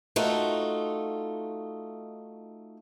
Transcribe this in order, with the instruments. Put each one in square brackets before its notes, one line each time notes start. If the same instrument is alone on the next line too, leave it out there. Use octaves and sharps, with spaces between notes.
[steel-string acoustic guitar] A3 D#4 F4 F#4